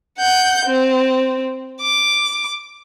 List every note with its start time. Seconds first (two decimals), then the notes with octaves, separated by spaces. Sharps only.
0.19 F#5 G6
0.66 C4
1.81 D6